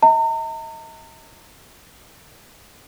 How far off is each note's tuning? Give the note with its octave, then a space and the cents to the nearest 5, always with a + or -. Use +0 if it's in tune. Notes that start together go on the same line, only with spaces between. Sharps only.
D#5 +45 A#5 -40